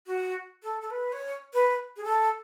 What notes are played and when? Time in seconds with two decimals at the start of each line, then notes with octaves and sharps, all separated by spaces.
0.07 F#4
0.63 A4
0.81 A4
0.90 B4
1.12 C#5
1.54 B4
1.96 G#4
2.04 A4